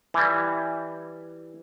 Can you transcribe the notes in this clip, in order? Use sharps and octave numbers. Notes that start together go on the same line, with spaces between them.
E3 G3